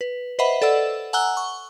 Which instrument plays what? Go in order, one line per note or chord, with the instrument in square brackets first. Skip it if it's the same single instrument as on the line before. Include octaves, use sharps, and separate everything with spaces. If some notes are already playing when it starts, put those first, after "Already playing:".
[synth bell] B4
B4 C5 D#5 E5 F#5 B5
A4 D5 F#5 E6
F#5 G#5 A#5 E6 F#6 G7
C#6